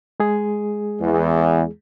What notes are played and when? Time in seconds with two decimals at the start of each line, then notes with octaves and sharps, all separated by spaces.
0.20 G#3 G#4
1.00 E2